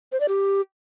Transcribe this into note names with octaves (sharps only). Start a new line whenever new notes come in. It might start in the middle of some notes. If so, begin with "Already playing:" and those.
C5
D5
G4